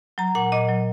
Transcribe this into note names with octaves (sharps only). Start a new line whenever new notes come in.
F#3 A#5
A#2 F#5
A#2 D#5
F#3